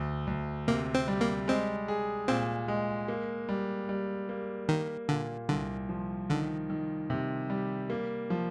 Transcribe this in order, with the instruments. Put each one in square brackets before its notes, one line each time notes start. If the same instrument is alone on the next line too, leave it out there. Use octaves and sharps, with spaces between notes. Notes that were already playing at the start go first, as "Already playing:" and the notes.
Already playing: [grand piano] D2
D2
[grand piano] C3 [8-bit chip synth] A#3
[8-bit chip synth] C4
[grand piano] G3
[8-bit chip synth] A#3
[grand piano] G#3 [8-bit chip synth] C4
[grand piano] G#4
[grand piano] A#2 [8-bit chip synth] C4
[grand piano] G#3
A#3
G3
G3
A#3
[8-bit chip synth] D#3 [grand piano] A#3
[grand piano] A#2 [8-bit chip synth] D3
[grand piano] C2 [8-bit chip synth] D3
[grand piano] F3
[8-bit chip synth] D3 [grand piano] D#3
[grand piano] D#3
C3
G3
A#3
F3